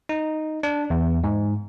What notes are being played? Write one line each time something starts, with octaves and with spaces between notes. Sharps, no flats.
D#4
D4
E2
G#2